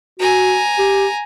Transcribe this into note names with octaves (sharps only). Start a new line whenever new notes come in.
F#4 G#5 A#5
G4